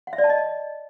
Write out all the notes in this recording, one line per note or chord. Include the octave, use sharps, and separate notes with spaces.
F#5
E5
D5
A5
D#5